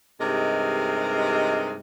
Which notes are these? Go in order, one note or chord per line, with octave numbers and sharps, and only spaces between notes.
G2 C3 G#3 D#4 A#4